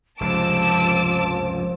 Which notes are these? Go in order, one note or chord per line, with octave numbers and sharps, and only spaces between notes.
F1 C#2 G2 F3 A5 D6 E6